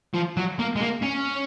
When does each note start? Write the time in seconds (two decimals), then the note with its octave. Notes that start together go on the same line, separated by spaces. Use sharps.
0.14 F3
0.37 F#3
0.59 A#3
0.76 G#3
0.81 A#3
1.03 C#4